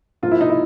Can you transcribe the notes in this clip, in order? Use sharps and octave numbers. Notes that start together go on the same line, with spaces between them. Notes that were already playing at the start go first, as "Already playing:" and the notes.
G#2 F3 A#3 F4
E4
D#4
E4